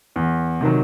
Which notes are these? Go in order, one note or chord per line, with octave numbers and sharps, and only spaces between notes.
E2
C3 D#3 F#3